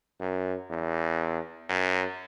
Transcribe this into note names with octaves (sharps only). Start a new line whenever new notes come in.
F#2
E2
F#2